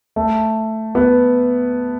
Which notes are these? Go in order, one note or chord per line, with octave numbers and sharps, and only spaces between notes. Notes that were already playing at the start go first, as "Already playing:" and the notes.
A3
B3